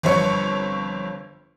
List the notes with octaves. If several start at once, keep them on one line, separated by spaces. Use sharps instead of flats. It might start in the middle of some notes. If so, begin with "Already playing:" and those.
G1 F2 C#5 C#7